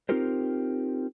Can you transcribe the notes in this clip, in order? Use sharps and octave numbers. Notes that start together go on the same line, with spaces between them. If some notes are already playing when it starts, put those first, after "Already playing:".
C4 D#4 F4 G4 A#4 C5